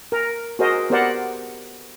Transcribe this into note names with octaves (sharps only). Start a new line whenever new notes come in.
A#4
F#4 G#4 A#4 C5 D#5
B3 G4 A#4 C5 D5 F#5